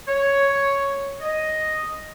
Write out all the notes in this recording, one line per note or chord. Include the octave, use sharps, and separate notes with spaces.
C#5
D#5